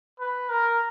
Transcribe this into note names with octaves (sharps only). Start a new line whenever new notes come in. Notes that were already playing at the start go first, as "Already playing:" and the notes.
B4
A#4